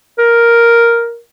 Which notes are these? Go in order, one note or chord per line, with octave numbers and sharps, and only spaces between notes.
A#4